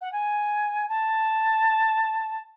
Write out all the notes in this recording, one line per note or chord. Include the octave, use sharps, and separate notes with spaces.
F#5
G#5
A5